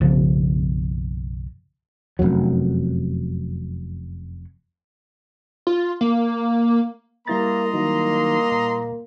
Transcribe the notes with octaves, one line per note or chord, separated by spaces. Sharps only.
F#1 B1 C#3 F3
F1 C#2 F#2 F#3
F4
A#3
G3 A#3 E4 D#5 A#5 C6 A6
D#3 F#3 A#3 D#4
A#2